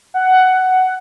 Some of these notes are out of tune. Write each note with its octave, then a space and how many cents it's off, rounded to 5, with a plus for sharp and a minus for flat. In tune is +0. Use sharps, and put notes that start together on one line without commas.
F#5 +10